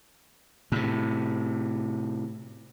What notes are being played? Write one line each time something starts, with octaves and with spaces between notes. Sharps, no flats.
A2 C3